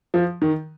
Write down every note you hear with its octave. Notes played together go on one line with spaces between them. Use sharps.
F3
D#3